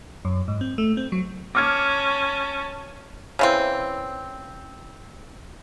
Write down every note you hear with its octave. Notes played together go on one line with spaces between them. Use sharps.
F#2
G#2
C4
A3
C4
F#3
C#4 A5 D6 F6 G#6
C#3 E3 C4